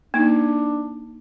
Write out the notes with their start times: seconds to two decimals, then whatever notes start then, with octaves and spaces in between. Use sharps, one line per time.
0.14 A#3 D4 D#4